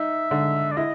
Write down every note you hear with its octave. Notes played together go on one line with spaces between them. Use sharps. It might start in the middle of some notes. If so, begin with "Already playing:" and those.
Already playing: D#4 E5
D3
D5
E4 D#5